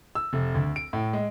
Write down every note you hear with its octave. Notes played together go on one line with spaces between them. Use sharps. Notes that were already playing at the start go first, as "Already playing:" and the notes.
E6
F1
D2
D7
A2
G#3